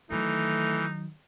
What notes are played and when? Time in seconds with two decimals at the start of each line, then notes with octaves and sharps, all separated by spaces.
0.11 D#3 E3 F#3 A3 D#4